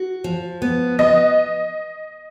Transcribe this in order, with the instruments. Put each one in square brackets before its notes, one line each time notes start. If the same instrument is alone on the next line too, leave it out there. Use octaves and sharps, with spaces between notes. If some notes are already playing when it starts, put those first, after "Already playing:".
Already playing: [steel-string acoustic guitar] F#4
F3
B3
[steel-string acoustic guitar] B3 [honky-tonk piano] D#5